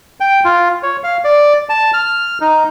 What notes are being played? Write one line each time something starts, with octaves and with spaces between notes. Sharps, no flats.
G5
F4
C#5
F5
D5
A5
F6
D#4